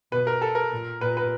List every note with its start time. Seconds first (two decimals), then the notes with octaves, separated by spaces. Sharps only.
0.12 B2 B4
0.27 A#4
0.41 A4
0.55 A#4
0.72 A#2
1.01 A#2 B4
1.17 B4